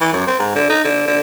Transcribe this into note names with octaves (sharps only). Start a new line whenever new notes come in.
E3
F#2
C4
G#2
D3
D#4
D3
D3